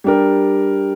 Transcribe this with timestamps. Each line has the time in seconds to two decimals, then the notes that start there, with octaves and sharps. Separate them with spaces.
0.04 G3 D4 G4 A#4